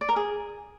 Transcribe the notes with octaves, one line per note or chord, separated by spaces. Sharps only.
D5
A#4
G#4